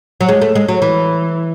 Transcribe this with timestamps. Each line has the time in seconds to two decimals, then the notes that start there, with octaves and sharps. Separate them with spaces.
0.21 F#3
0.29 G#3
0.42 A3
0.55 G#3
0.68 F#3
0.82 E3